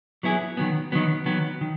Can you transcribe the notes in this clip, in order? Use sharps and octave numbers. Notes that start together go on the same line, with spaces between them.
F#3 B3 E4 G#4
D#3 F#3 B3
D#3 F#3 B3
D#3 F#3 B3
D#3